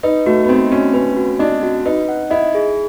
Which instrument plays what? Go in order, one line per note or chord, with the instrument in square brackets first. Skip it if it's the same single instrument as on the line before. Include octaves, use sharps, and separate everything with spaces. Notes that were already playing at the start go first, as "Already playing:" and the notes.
[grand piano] D#4 [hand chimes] B4
[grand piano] A3 [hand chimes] F#4
[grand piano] B3
[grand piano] C4 [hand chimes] D#5
[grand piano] C#4 [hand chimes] F#4
[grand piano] C#4 [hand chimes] B4
[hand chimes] F#4
[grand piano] D4 [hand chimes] D#5
[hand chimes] F#4
[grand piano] D#4 [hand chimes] B4
[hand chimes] F#5
[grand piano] E4 [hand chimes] D#5
[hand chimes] G#4